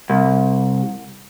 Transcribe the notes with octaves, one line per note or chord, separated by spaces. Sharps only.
C2